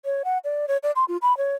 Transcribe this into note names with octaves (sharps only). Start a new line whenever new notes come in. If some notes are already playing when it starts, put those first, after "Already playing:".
C#5
F#5
D5
C#5
D5
C6
F4
B5
C#5